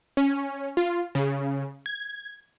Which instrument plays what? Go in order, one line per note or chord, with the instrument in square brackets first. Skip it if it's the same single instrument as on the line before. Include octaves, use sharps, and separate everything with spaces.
[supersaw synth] C#4
F4
C#3
G#6